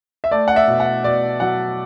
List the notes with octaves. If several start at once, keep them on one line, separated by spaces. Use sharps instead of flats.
E5
A3 D5
F#5
E5
B2
F#5
B2 D5
F#3 F#5